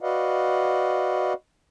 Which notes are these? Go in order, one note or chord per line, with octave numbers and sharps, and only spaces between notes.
F#4 B4 D5 D#5 F5 F#5